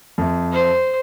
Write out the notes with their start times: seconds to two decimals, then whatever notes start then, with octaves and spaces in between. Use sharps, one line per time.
0.18 F2 E5
0.52 C5